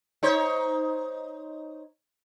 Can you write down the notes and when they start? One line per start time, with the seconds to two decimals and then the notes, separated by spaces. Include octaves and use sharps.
0.23 D#4 C5 C#5